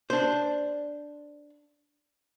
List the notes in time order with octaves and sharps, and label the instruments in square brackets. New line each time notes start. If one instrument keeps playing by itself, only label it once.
[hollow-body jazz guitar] D4 C5